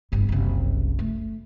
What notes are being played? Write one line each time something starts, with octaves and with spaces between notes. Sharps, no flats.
G1 A2
F#1 C2
A3